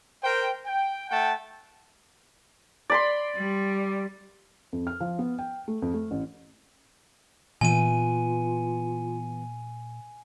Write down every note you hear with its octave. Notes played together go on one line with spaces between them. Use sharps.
A#4 C5 G5
G5
A3 F#5 G5 A5
D5 B5 C6
G3
F2
F6
F3
B3
G5
A3
F2
A3
A1
A#2 E3 B3 F4 G5 G#5 D#7